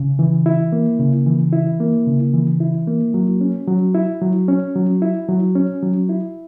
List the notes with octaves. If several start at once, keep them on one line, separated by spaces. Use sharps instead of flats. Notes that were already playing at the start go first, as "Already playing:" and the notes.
Already playing: C#3
E3
E4
A#3
C#3
E3
E4
A#3
C#3
E3
E4
A#3
F#3
C#4
F#3
E4
F#3
C#4
F#3
E4
F#3
C#4
F#3
E4